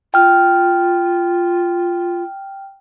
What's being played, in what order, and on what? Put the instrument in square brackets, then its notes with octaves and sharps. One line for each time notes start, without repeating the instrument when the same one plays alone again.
[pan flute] F4 [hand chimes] G5 F6